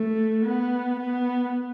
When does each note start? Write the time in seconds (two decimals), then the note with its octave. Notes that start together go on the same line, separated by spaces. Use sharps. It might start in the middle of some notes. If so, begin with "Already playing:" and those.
Already playing: A3
0.45 B3
0.99 B3